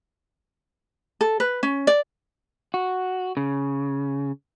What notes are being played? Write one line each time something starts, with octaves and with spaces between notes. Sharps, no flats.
A4
B4
C#4
D5
F#4
C#3